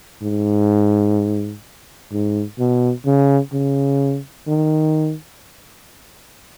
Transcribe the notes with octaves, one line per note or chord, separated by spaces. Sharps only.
G#2
G#2
B2
C#3
C#3
D#3